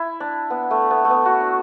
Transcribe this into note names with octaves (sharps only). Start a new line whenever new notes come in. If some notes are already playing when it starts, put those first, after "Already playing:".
Already playing: E4
D4
B3
A3
B3
A3
B3
F#4
D4